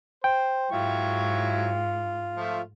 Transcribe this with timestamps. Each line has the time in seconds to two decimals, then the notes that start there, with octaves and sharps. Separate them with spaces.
0.24 C5 G5
0.72 G#2 F#3 E4 F4 C#6
2.37 F3 A3